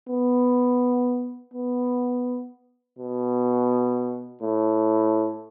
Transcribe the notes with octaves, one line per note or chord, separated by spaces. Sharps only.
B3
B3
B2
A2